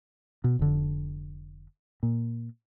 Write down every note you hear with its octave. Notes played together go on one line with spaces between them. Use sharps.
B2
F1 D3
A#2